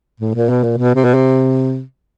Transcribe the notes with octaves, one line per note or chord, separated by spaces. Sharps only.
A2
A#2
B2
A#2
B2
C3
B2
C3